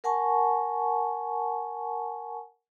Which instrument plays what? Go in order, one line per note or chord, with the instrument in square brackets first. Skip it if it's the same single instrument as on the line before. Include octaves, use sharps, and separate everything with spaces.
[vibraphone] A#4 F#5 G#5 A5 C#6